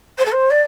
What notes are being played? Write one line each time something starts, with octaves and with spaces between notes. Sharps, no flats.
C5
A4
C5
D5